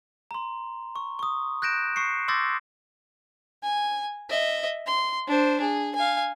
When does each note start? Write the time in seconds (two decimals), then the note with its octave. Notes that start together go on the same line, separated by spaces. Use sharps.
0.31 A#5 C6
0.96 C#6
1.19 C#6 D#6
1.62 F#6 G6 A#6 D7 E7
1.96 C#6 C7 C#7
2.28 C6 D6 E6 G6 A6 A#6
3.63 G#5
4.30 D#5 E5
4.86 C6
5.27 D4 C5
5.61 G#4
5.95 F5 G#5